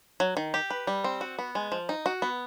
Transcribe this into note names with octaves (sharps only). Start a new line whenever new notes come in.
F#3
D#3
G4
B4
G3
C4
F#4
B3
G#3
F3
D#4
F#4
B3